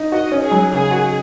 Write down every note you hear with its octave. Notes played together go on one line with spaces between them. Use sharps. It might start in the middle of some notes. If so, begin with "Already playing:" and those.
Already playing: D#4
F#4 D#5
C#4
G#4
F#3
C#3 G#4
F#4